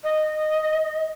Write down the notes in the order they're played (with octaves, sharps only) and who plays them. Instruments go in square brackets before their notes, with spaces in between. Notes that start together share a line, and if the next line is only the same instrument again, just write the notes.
[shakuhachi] D#5